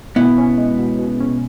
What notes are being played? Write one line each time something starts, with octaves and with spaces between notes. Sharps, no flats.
B2 B3 E4
C#4
G#3
B2
B2
C#4